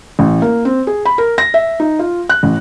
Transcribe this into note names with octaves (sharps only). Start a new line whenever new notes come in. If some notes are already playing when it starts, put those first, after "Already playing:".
A1
A#3
C4
G#4
B5
A#4
A#6
E5
D#4
F4
F#6
A1